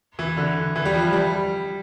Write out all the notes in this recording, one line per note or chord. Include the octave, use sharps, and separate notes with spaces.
E3
D3
E3
G3
F3
G3